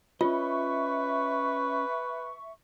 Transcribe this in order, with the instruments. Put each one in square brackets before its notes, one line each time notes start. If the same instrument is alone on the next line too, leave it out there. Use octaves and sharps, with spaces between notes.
[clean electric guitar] C#4 C#5 D#5 [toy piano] F4 [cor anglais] B4 [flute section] E5 C#6